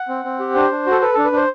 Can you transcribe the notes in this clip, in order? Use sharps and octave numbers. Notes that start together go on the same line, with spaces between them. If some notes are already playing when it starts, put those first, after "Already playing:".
Already playing: F#5
C4
C4
G4
D4 C5
D4
F#4 A4
A4 B4
D4 A4
B4
D4 C5